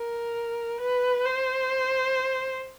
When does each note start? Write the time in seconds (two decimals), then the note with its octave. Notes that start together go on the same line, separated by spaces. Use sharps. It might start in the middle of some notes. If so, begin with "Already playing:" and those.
Already playing: A#4
0.80 B4
1.26 C5